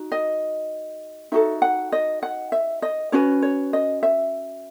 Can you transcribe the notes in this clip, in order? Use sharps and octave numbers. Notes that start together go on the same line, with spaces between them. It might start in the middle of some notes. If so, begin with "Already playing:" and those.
Already playing: D#4 F#4
D#5
D#4 F#4 A4 E5
F#5
D#5
F#5
E5
D#5
C#4 F#4 B4 C#5
C#5
D#5
E5